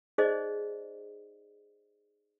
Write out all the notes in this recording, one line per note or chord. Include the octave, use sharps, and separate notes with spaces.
D#4 G#4 C5 D5 D#5